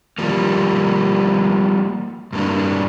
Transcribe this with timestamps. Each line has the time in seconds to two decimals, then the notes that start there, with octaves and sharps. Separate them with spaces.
0.18 F3 G3 A#3
2.33 G2 A#3 D4